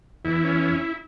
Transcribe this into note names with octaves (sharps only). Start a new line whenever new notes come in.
E2 E4
C#4